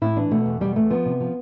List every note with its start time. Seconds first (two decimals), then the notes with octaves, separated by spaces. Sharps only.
0.01 A2 E4
0.16 E3 D4
0.31 B2 A3
0.46 E2
0.61 B2 G3
0.76 E2 A3
0.90 F3 B3
1.05 C3
1.20 F3